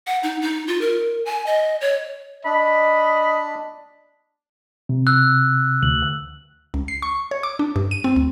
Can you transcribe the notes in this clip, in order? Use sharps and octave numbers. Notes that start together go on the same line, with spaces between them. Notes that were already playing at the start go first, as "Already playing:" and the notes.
F#5
D#4
D#4
F4
A#4
G#5
D#5
C#5
D4 D#5 B5
C3
E6 F#6
D2 F#7
C#2
C7
C#6
C#5
D6
D4
G2
D#7
C4
D2